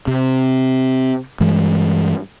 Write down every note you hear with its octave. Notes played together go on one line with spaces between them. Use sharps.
C3
G2 E3 G#3